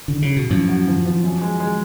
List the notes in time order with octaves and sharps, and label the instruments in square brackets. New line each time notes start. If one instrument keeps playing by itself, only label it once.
[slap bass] D3
C#3
B2
[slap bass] F#2 A2 [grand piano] F3
[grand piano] F#4
F3
F3
F#2
G#3
G#3